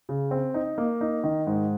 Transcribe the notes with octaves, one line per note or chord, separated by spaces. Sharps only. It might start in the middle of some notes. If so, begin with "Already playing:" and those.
C#3
C4
D#4
A#3
D#4
D#3
G#2